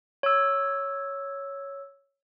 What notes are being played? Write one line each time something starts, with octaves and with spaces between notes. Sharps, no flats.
C#5 E6